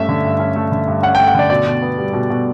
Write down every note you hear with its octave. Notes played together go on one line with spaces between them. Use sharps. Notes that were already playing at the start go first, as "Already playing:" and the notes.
Already playing: G2 A3 C#4 E5
D3
G2
C#4
A3
D3
G2
C#4 F#5
G5
A3
F#5
D3 D5
B2 D5
B2
B3
G3
B2
B2